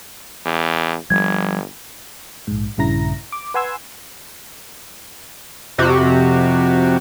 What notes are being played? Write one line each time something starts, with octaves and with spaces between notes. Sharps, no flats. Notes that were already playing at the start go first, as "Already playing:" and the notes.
E2
G1 F3 G3 G#6
A#1 G#2
A#1 G2 C#3 E4 A#5 A#6
D6
B4 F#5 G#5 C6 E6 G#6
F2 C3 F#4 G4